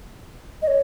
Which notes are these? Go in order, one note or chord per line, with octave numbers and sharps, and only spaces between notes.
D#5
C#5